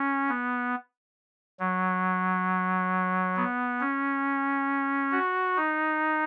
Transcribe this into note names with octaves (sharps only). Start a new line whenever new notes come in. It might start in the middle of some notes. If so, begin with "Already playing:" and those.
Already playing: C#4
B3
F#3
B3
C#4
F#4
D#4